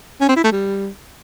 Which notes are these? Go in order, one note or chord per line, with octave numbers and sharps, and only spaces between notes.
C#4
C4
E4
A3
G3